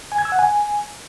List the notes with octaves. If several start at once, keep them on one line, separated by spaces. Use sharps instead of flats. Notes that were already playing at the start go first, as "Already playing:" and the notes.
G#5
G#6
E6
F#5
G#5